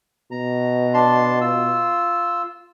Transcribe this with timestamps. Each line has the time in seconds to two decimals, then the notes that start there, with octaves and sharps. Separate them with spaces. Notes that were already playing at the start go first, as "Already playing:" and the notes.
0.31 B2 A#5
0.94 D4 A5 C6
1.41 F4 E6